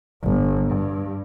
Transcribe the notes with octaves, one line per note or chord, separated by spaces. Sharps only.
G1
G2